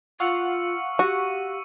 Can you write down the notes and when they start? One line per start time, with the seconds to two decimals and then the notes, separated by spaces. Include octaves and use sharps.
0.20 F4 F5 F#5 C#6 E6 C#7
0.99 F#4 G4 D#7